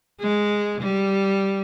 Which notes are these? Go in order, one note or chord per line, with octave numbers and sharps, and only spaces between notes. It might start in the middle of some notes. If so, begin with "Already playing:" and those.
G#3
G3